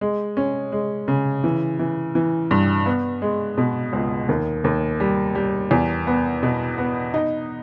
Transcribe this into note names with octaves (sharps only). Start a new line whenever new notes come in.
G#3
C#4
G#3
C#3
E3
E3
E3
G2
B3
G#3
B2
C#2
D#2
D#2
G3
G3
E2
B3
B2
B3
D#4